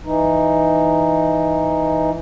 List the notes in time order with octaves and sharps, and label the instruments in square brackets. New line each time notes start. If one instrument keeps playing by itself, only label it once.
[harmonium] E3 D#4